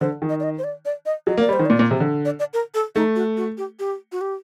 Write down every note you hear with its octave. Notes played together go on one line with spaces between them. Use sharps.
D3 C5
D#3
D#5
D5
D#5
C5
D5
D5
D#5
F#3 D#5
A#3 D5
G3
C5
D#3
A#2 D5
A#2
C3
D3
D5
D5
A#4
A4
A3 D#4
F#4
F#4
G4
G4
F#4
G4